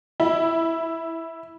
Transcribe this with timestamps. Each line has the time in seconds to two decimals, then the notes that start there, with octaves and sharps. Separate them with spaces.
0.20 E4